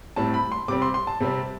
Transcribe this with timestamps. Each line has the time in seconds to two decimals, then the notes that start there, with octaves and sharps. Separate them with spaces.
0.16 A2 G3 C4 A5
0.34 B5
0.52 C6
0.68 C3 G3 C4 D6
0.82 C6
0.94 C6
1.07 A5
1.20 C3 G3 C4